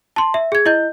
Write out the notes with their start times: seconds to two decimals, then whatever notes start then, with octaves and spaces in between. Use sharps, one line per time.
0.16 A5 C6
0.34 E5
0.52 G#4 G#6
0.66 E4 D#5 G6